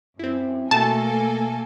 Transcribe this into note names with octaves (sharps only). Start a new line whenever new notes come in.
F#2 C4 E4
B2 A3 A#3 A4 G#5 A5